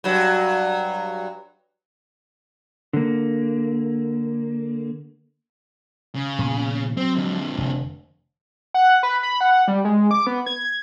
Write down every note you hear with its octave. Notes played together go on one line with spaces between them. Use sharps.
G2 F#3
D3 A#3
C#3
A#2 F3 B3
F#3 C4
F2 D3
F1
F#5
B4
B5
F#5
G3
G#3
D6
B3
G#6
G#6